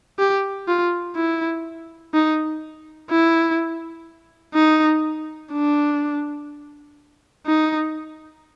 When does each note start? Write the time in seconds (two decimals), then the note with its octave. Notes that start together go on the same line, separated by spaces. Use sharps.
0.19 G4
0.68 F4
1.16 E4
2.14 D#4
3.10 E4
4.55 D#4
5.52 D4
7.46 D#4